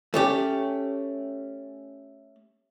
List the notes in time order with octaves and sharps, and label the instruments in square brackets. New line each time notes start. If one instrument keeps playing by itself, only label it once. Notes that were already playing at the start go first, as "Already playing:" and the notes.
[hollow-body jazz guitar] A3 C#4 G4